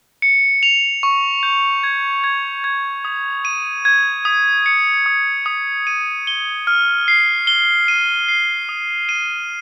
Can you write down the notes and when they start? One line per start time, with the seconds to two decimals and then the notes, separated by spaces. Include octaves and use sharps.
0.22 C#7
0.63 F7
1.03 C#6
1.43 G6
1.83 G#6
2.24 G#6
2.64 G#6
3.05 D#6
3.45 D#7
3.85 G#6
4.25 D#6
4.66 C#7
5.06 D#6
5.46 D#6
5.87 D#7
6.27 G7
6.67 F6
7.08 C7
7.47 G7
7.88 D#7
8.28 C7
8.69 D#6
9.09 D#7